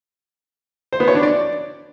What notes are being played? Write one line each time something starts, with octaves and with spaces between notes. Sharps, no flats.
C5
B3
C#5
D4
D5